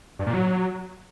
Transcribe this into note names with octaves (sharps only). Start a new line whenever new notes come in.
G2
A#2
F#3